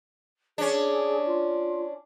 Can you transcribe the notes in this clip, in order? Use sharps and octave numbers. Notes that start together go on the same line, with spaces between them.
C#4 D4 G#4
F4